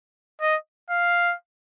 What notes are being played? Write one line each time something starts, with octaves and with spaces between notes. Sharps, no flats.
D#5
F5